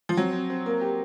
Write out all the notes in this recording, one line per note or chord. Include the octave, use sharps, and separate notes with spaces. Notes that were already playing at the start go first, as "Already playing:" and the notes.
F3
F#3 C4
C4
C4
A#3
G4